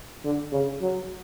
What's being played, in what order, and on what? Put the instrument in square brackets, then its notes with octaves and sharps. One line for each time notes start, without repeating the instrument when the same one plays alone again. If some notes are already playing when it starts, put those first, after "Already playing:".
[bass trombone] D3
C#3
F#3